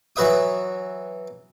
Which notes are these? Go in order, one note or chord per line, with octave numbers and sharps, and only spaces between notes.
E3 F#3 F#4 B4 E5 D#6